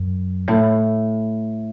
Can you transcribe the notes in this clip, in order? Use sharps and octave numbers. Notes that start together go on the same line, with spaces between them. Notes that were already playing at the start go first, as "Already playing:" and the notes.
Already playing: F#2
A2